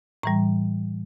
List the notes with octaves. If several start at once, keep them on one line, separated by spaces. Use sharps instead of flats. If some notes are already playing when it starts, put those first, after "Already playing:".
A2 E3 G3 A#5